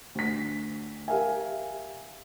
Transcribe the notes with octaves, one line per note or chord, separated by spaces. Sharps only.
D2 B6
G4 A#4 E5 F5 G#5